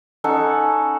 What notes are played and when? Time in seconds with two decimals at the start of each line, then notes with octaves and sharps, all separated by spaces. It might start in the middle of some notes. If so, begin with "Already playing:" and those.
0.24 C#4 D#4 A4 F#5